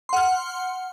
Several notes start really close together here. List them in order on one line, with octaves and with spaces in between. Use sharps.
C6 F#5 F6